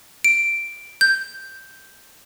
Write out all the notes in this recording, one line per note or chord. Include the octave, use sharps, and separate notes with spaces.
D7
G6